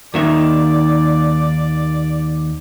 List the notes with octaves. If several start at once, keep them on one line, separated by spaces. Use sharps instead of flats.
D#2 D#3 D5 E5